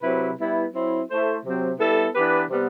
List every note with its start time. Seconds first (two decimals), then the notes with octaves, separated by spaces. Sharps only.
0.02 C3 F#3 C4 E4 B4
0.37 G3 B3 E4 B4
0.73 F#3 C4 E4
1.09 A3 E4 A4 C5
1.44 C3 F#3 C4
1.79 G3 B3 E4 A4
2.14 E3 B3 D4 G4 B4
2.50 C3 G3 B3